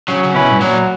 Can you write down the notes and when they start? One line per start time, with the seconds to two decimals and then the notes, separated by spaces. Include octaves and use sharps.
0.08 C#3 F#3
0.23 C#3
0.34 B2 C#4 E4 B4
0.50 G2
0.60 A#2 F#3